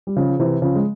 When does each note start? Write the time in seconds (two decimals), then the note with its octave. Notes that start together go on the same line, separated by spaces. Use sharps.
0.07 G3
0.16 C#3 F3
0.29 F3
0.40 C3 E3
0.62 C#3 F3
0.75 G#3